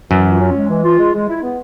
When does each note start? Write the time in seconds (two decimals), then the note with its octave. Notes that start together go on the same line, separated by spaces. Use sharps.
0.11 F#2 E3
0.26 F4
0.40 C#4
0.55 G#3
0.69 E3
0.84 F4
0.98 G#3
1.14 G#3
1.28 E4
1.42 B3